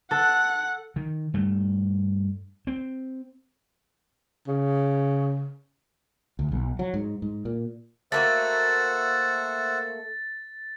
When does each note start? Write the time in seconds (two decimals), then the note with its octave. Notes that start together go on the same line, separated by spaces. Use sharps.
0.11 A4 F#5 F#6
0.96 D#3
1.34 G2 A3
2.67 C4
4.47 C#3
6.39 D2
6.52 B1
6.79 F#3
6.94 G#2
7.22 G#2
7.45 A#2
8.12 A3 A#3 F#4 C5 E5 F#5 A6